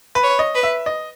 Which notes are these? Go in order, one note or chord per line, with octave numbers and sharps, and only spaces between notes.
B4
C#5
D#5
B4
E5
D#5